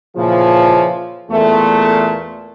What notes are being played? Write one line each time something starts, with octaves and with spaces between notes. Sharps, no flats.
A#2 C#3 E3 F3
E2 A#2 A3